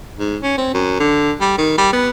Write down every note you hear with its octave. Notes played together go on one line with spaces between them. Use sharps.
G#2
C#4
C4
F#2
D3
G3
D#3
G3
B3